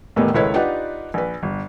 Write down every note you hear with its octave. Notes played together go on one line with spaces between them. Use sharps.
E2 A2 D#3 G3 A3 B3
C#2 D#3 E4 A4 B4 C#5
D4 D#4 F4 G4 B4 F#5
A#1 B4
G1